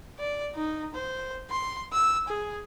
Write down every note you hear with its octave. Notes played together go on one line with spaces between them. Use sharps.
D5
D#4
C5
C6
E6
G#4